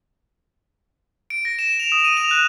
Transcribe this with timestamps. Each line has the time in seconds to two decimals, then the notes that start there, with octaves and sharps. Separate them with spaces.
1.30 D7
1.45 A#6
1.59 E7
1.80 F7
1.92 D#6
2.04 D#7
2.17 F7
2.31 F#6